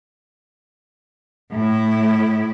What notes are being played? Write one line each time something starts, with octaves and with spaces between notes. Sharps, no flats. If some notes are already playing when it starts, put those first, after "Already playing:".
A2 E4